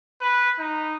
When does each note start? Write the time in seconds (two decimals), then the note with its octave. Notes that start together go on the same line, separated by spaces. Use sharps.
0.21 B4
0.59 D#4